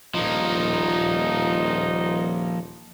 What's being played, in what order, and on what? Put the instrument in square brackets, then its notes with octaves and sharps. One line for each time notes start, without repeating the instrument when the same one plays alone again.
[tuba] D#1 [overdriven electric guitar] F3 A#3 [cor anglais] D#4